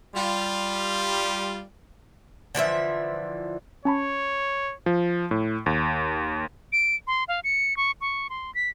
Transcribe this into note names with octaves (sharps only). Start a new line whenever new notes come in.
G3 F4
D3 E3 F3 E5
C#4 C#5 A5 B5
F3
A2
D#2
D7
C6
F5
C#7
C#6
C#6
C6
B6